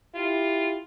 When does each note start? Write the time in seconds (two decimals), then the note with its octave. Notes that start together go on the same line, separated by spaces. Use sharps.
0.15 E4 F4 G4